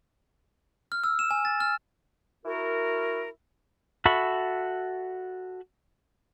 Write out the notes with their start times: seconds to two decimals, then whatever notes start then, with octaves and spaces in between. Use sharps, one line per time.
0.92 F6
1.04 E6
1.19 E7
1.31 G#5
1.45 A6
1.60 F6
2.46 E4 F#4 A#4
4.06 F#4 A4 E5 B5 C#6